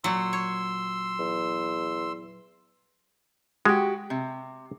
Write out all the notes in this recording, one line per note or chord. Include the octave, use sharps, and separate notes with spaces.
A#2 F#3 C6 E6
C#5
E2
G#3 F#4 G4
C3